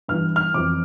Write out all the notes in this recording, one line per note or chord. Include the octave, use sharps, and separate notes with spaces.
G2 E3 F6
F6
F2 E3 D6